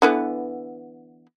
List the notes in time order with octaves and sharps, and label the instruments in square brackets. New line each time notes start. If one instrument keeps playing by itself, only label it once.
[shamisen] D3 E3 B3